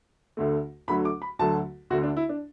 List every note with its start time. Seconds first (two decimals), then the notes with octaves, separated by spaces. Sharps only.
0.37 D2 D3 A3
0.88 D2 D3 F#3 A3 B5
1.05 D6
1.22 B5
1.39 D2 D3 F#3 A3 A5
1.90 D2 D3 A3 F#4
2.03 D4
2.17 E4
2.29 D4